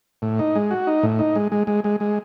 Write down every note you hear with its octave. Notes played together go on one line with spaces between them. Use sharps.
A2
D#4
G#3
F#4
D#4
A2
D#4
G#3
G#3
G#3
G#3
G#3